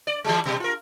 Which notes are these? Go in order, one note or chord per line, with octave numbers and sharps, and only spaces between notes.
D5
E3 G3 G#3
B2 G3
F4 A#4